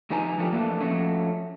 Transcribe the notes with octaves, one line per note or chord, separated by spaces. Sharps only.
F2 C3 D#4 B4 G#5 A#5
F3 A3 D4 F4 G4
F2 E3 A3 A#3 D4
F3 F#3 A3 C#4